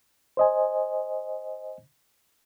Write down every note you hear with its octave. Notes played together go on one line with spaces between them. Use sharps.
C5 D#5 G#5